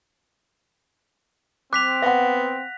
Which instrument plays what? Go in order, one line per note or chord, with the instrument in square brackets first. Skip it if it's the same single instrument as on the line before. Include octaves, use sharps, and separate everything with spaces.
[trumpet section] C4 [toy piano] D6 [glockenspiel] F#6 B6 F7
[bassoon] B3 [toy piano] F5 F#5 [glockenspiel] A#6